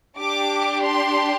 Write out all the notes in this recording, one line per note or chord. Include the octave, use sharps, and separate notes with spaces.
D4 G4 D6
C6